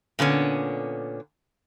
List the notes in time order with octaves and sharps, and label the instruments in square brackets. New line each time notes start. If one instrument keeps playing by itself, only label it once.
[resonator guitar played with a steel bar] A#2 D3 B3 C#4